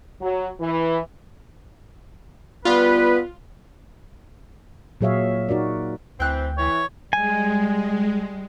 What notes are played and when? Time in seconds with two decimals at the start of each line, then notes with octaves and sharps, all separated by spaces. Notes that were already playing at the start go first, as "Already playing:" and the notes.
0.21 F#3
0.59 E3
2.65 G3 B3 F4 B4
5.01 A#2 F#3 G#4 C#5 E5 F5
5.49 D#4 F#4 A#4 D5
6.20 D2 E3 C4 G5 F#6
6.58 E3 C#5
7.13 G3 G#3 G#5